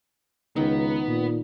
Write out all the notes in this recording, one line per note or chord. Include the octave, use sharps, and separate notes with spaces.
C#2 D#3 B3
A#2